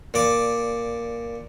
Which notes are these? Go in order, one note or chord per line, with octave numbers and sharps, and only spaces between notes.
A#2 D5